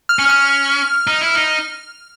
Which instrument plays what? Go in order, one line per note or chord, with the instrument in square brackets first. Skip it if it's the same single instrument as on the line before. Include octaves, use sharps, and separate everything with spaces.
[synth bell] F6
[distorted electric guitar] C#4
[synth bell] F6
[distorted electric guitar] D#4
E4
D#4